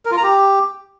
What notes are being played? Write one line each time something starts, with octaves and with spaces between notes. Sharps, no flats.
A#4
F4
A#5
G4